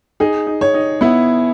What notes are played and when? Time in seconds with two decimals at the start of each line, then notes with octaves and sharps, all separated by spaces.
0.20 D#4 G#4
0.47 D#4
0.61 C#5
0.74 D#4
1.01 B3 E4